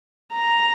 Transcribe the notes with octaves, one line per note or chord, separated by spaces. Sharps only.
A#5